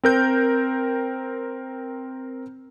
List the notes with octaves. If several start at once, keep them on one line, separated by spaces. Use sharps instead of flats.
C4 A#4 G6